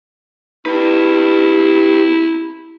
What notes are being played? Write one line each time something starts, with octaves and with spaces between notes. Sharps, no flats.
E4 G4 B4